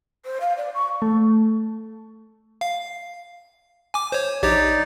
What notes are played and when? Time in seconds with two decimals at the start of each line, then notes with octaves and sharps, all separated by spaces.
0.25 C5
0.41 F5
0.57 D5
0.74 C#6
1.02 A3
2.61 F5
3.94 G#5 D6
4.12 C5 C#5
4.43 A#1 D#4 G4 C#5 D5